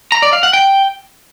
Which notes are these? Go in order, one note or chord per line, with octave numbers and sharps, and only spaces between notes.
A#5
D5
F5
F#5
G5